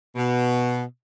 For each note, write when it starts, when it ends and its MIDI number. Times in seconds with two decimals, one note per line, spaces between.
0.16 0.81 47